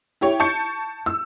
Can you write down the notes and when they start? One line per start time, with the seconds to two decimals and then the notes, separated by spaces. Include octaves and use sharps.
0.21 E4 G4 C#5
0.40 A5 C#6 G6 C#7
1.06 E6